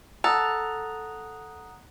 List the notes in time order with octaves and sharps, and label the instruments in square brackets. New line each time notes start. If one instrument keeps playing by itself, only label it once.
[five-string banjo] A4 [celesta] F#5 D#6 F#6 [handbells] A#5